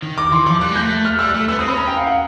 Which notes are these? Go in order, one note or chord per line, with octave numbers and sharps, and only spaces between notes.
D#3
D6
E3 C6
F3 D6
G3 F#6
G#3
A#3 G6
A3
F#6
F6
G3 E6
A3 F#6
B3 E6
C4 D#6
C#4 B5
A#5
G5
F5
F#5